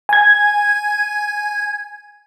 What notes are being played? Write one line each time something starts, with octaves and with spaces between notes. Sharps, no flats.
G#5 G#6